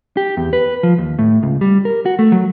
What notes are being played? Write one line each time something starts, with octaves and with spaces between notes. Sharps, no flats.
G4
E2
B4
F3
D#2
A2
C#2
G3
A#4
F#4
A3
F#3